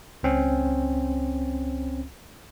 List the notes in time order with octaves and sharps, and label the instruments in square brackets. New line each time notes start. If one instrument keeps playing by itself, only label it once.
[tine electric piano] C#2 C4 C#4